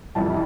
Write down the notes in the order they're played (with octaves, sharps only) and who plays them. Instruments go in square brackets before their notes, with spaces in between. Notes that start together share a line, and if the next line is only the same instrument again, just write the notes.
[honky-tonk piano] F2 C3 E3 G3 A5